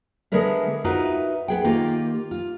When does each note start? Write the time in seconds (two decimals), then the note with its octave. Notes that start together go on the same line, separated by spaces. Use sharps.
0.32 D3 G#3 B3 D4 A#4 E5
0.84 D#4 F4 F#4 A#4 B4 E5
1.48 B3 G#4 G5
1.64 D#3 A#3 F4 G4
2.31 F4